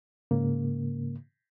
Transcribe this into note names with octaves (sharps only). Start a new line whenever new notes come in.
G#2 C#3 A#3